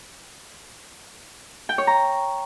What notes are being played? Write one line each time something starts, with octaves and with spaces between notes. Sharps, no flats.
G5
C#5
A#5